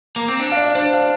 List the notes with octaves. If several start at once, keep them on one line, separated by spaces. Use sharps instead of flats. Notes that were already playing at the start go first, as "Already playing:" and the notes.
A#3
C4
D4
F5
D5
D4 C5
F5